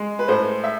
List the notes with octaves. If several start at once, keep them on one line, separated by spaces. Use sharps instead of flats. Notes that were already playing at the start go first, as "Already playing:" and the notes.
Already playing: G#3
B4
A2 C5
E5